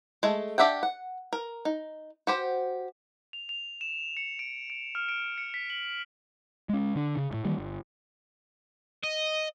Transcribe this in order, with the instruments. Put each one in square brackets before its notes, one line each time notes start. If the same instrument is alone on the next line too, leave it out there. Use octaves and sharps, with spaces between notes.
[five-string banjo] G#3 A3
D4 G4 E5 F#5 G5
F#5
A#4
D#4
F#4 G4 C5
[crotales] F7
F7
E7
C#7
D7
D7
F6
D7
C#7
B6
F#7
[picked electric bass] G#3 C#4
D3 D4
C#3
E1 A2
D#3 E3 G3 A#3
G1
[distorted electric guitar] D#5